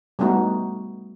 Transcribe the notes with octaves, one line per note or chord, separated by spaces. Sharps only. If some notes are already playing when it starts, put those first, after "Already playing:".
G3 A3 B3 D#4 F#4